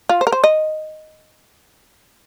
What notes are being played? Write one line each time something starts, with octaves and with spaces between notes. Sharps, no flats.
F4
C5
A#4
C5
D#5